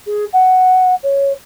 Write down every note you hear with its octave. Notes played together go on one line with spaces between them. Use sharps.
G#4
F#5
C#5